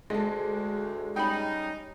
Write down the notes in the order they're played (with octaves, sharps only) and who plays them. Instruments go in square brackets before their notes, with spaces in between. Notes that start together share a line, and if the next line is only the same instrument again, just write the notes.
[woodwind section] D2 [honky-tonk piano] G#3 [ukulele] A4 D#5
[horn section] G3 C#4 D#4 [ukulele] G5 B5